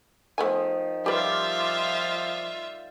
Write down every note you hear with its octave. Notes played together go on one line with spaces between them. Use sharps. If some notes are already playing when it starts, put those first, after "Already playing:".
D#3 F3 A3 B3 G#5
F3 G3 F4 G4 B4 D5 E5 F5